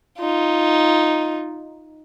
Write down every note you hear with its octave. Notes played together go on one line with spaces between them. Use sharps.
D#4 F4